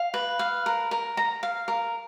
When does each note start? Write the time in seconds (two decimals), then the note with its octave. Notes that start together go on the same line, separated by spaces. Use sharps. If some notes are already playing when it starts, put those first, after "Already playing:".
Already playing: F5
0.14 B4
0.39 F5
0.66 A#4
0.91 A#4
1.17 A#5
1.43 F5
1.68 A#4